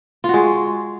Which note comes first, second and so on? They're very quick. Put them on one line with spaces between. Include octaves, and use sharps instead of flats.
F4 F#4 G#3